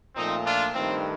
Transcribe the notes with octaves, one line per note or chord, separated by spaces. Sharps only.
A#2 F3 A3 C4 D#4
D4 F4
G2 D#3 A3 C4